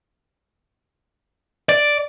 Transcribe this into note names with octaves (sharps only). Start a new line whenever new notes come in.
D5